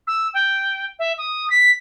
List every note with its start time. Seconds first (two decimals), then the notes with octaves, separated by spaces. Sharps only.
0.07 E6
0.34 G5
0.99 E5
1.18 D#6
1.50 B6